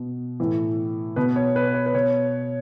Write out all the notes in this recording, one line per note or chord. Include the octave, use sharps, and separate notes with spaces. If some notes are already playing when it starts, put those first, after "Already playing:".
Already playing: B2
A2 E3
B2 B4
C#5
B4
C#5
B4
B2 C#5